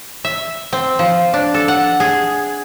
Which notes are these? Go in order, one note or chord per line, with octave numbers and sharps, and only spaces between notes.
E5
C4
F3
D4
A4
F#5
G#4